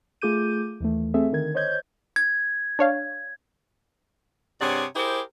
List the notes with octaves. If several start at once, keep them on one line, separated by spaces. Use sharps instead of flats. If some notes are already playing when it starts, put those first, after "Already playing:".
A3 F4 G#4 D6 G6 D#7
D#2 E3 A3
A3 C4 G#4 A4 E5
D3 D#3 A#4 G#6
C5 C#5 D#5 G6 G#6
G#6
D4 C#5 F5
G2 C3 G#4 C#5 D5 F#5
E4 G4 G#4 A#4 C5